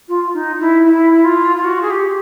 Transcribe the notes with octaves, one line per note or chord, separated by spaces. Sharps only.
F4
D#4
E4
E4
E4
F4
F4
F#4
G#4
G4